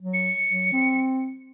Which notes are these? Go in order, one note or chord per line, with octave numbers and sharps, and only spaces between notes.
F#3
C#7
F#3
C4